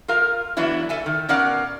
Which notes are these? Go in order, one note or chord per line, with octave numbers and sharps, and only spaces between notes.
F4 A#4 F5
D3 E3 F#3 B3 D4 E4
A4 E5 G#5
D#3
B2 C#4 A#4 D5 F5 F#5